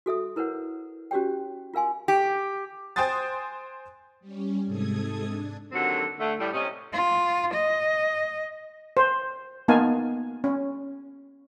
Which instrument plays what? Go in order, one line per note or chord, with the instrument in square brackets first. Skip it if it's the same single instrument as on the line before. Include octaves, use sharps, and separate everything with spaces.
[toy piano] F#4 A4 E5 D#6
E4 A#4 B4 C#5 F#5
C#4 F#4 G4 C#5 G5
F4 A#4 F5 G#5 C6
[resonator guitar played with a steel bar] G4
[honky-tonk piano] C5 G5 G#5 C6 D#6 A6
[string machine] G3 C#4
G#2 C3 G#3 A4 D#6 G#6
D4
[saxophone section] D#2 D3 F#3 C4 F#4 A4
D3 A3
A2 G3
C3 C#4 D#5
[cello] F4
D#5
[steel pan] C5
A#3 B3 D#4 F5 G#5 A5
C#4